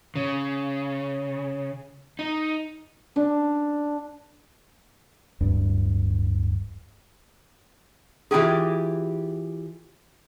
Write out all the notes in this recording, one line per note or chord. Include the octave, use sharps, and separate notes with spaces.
C#3
D#4
D4
D1 G2
E3 E4 F4 G4 G#4